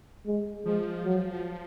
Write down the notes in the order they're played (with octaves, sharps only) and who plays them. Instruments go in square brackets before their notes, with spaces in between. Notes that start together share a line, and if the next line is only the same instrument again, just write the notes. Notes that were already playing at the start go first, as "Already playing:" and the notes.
[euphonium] G#3
[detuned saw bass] F3 [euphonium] G#3
[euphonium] F#3